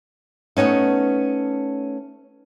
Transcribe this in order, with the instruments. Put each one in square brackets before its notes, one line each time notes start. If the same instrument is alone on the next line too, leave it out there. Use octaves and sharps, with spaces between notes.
[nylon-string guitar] A3 B3 C#4 D#4